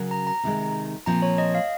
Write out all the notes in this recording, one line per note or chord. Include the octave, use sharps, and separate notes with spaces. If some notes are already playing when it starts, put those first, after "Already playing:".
Already playing: C#3 F#3 C#4 F#4 A#4
A#5
A#5
C3 D#3 G#3
A#2 F3 C4 F4 A#5
C#5
D#5
F5